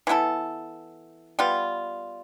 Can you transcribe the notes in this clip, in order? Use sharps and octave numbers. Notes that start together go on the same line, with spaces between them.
E3 B3 E4 A4
G3 B3 F4